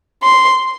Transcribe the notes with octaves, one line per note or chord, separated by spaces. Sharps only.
C6